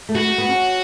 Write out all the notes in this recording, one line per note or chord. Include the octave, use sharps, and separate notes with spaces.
A3
B3 F#4
A3
B3
C#4